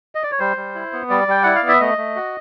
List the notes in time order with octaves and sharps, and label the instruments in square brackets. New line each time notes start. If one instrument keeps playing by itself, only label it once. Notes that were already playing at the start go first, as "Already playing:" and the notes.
[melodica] D#5
D5
C#5
G3 C5
G3
E4
B3
G3 D5
G3 G5
E4 F#5
F5
B3
E5
A3 D#5
A3
F#4